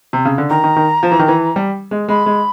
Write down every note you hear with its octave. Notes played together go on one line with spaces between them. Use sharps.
C3
C#3
D3
D#3 A#5
D#3
D#3
F3
E3
D#3
E3
G3
G#3
G#3 B5
G#3